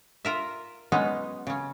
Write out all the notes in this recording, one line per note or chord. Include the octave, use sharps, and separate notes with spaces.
F4 A#4 E5
F#3 G#3 B3 C#4 D#4
C#3 C#4